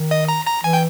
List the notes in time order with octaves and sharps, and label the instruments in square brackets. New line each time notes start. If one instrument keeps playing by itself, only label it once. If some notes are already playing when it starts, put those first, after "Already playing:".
Already playing: [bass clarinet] D#3
[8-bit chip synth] D#5
A#5
A#5
[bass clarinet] E3 [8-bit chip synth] G#5
[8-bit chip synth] G5